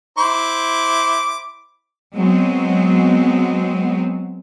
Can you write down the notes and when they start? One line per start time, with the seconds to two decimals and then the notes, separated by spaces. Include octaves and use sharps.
0.18 E4 C5 D6
2.15 F#3 G#3 B3 C4